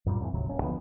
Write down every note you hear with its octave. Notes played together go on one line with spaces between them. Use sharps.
F#2 A#2 G3
F2 A2 D3 E3
D2 G#2 C3 F#3
D1 A#3 C#4
D#2 D3 F3 B3